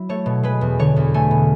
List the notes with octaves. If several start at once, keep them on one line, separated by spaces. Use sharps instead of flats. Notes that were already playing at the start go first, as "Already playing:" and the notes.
Already playing: F#3 E4
A3 C#5
B2
G#3 B4
E2
D3 C#5
E2
A3 G#5
B2